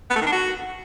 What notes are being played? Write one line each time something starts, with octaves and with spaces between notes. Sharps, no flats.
B3
A3
D#3
D4
F#4